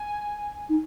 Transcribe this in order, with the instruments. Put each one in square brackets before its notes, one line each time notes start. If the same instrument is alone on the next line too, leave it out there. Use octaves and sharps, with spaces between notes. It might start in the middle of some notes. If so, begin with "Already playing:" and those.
Already playing: [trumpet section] G#5
[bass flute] D#4